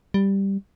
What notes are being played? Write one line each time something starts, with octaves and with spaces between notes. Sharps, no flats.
G3